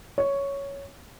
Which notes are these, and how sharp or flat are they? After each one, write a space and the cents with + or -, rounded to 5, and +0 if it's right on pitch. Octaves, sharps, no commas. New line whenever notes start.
C#5 +5